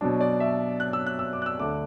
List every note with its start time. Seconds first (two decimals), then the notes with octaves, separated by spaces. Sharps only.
0.01 B2 F#3 D4
0.21 D5
0.40 E5
0.80 F#6
0.93 E6
1.06 F#6
1.19 E6
1.33 D6
1.42 F#6
1.46 E6
1.59 D2 D3 A3 D4 D6